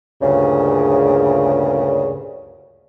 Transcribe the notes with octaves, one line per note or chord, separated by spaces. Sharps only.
D2 G2 A#2 C#3